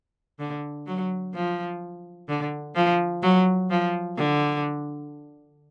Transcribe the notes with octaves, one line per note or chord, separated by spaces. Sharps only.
D3
F#3
F3
D3
F3
F#3
F3
D3